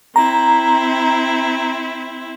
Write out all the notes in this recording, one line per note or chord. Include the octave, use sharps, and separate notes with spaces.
C4 E4 A#5